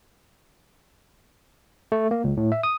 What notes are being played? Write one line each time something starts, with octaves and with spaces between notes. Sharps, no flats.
A3
A#3
C#2
A2
E5
D#6